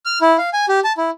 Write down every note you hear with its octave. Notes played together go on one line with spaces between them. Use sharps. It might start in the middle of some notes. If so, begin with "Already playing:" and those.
F6
E4
F5
G#5
G4
A5
E4